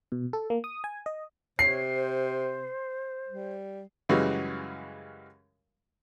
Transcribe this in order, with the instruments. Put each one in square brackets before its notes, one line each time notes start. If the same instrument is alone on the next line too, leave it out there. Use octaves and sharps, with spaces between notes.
[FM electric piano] B2
A4
A#3
D#6
G#5
D#5
[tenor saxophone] C3 [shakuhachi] C#5 [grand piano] C7
[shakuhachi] C5
[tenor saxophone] G3
[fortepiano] F#2 C#3 E3 G3 G#3 F#4